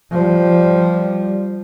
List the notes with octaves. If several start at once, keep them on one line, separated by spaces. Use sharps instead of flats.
F3 G3